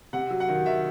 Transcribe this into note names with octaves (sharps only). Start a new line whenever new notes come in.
C3 F#5
F#3
F#5
D#3
D#3 E5